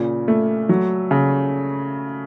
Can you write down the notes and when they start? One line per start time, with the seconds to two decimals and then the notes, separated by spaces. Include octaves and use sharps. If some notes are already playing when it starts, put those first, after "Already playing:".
Already playing: A#2 C#3
0.28 A3
0.69 F#3
1.11 C#3